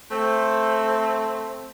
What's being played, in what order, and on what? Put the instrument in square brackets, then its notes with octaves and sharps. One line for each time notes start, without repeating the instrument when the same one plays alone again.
[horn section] A3 C4